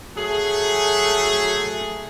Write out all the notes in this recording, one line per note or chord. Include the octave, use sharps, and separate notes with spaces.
F#3 A3 G#4